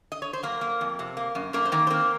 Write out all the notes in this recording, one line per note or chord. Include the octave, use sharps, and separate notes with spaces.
D#5
C#5
C5
F#3 A#3 A#4
A#3
F2
C3
A#3
F#2
F#2 A#3 A#4
C5
D#3 A#3 A#4
C5
A#3 C4 A#4